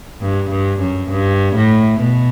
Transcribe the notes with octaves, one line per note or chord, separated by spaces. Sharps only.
G2
G2
F#2
G2
A2
B2